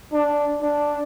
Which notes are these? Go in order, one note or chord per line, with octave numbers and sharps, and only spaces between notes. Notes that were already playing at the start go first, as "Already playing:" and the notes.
D4
D4